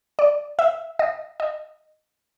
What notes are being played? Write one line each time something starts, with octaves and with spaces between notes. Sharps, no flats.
D5
E5
D#5
D#5